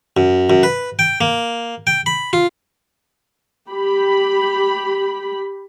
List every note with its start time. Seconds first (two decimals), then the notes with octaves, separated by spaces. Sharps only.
0.17 F#2
0.50 F#2
0.63 B4
0.99 G5
1.21 A#3
1.87 G5
2.06 B5
2.33 F4
3.69 G4 B5